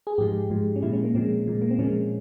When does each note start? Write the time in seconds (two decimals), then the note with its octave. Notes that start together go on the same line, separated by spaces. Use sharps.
0.07 G#4
0.18 G#2 F3 G#3 G4
0.50 G#2 F3 G#3
0.76 C#4
0.82 A#2 F3 G#3 E4
0.93 C#4
1.03 A#3
1.15 A#2 F3 G#3 C4
1.47 A#2 F3 G#3
1.62 A#3
1.71 C4
1.78 A#2 F3 G#3 C#4